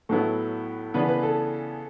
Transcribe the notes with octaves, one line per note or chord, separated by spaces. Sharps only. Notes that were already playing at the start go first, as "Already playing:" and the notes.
A2 F#3 B3 E4 A4
C#3 E3 B3 D4 B4
B4
A4